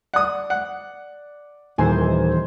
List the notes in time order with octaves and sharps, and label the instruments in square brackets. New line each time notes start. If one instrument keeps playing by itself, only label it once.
[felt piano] D5 [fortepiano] F#5 D#6
[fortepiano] F#5
[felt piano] D#1 G#5 [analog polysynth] D#3 E3 C5